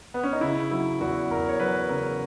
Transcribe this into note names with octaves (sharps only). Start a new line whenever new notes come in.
B3
C#4
D#4
C#3 E4
F#3 E4
E2 F#4
E2 A#4
C#5
F#3 B4
C#3 A#4